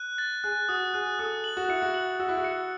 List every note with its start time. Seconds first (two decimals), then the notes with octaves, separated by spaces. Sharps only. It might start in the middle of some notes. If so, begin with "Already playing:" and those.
Already playing: F#6
0.18 A6
0.44 G#4 F#6
0.69 F#4 D#6
0.94 G#4 F#6
1.19 A4 D#6
1.44 F#7
1.57 F#4
1.69 E4 C#7
1.82 F#4
1.94 F#7
2.19 F#4 E6
2.29 E4
2.37 F#4
2.44 C#7